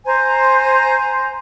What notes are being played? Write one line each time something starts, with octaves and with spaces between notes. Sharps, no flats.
C5 G#5 A#5